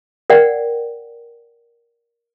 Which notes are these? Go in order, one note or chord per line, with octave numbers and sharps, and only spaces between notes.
A#4 D5 F#5 G5